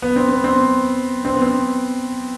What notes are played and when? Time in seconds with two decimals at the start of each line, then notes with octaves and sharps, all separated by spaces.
0.02 B3
0.16 C4
0.30 B3
0.44 C4
1.25 C4
1.34 B3
1.42 C4